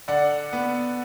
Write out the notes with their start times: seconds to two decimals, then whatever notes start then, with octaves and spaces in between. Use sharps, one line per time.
0.08 D3 D5 F#5
0.53 B3